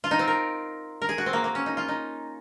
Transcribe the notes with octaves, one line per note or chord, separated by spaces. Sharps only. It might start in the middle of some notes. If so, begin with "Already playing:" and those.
F4
D#4
C4
A#4
A#4
G#4
F#4
C4
A#3
A#3
C#4
D#4
F4
D#4